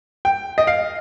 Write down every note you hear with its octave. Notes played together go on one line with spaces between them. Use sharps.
G5
D#5
F5